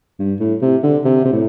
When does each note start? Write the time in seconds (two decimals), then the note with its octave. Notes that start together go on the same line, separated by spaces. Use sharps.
0.19 G2
0.40 A2
0.62 C3
0.83 D3
1.05 C3
1.25 C3
1.32 A2